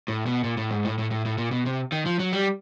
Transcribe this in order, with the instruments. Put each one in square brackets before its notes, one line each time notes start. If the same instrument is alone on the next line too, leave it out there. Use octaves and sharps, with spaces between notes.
[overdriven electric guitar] A2
B2
A#2
A2
G#2
A2
A2
A2
A2
A#2
B2
C3
D#3
F3
F#3
G3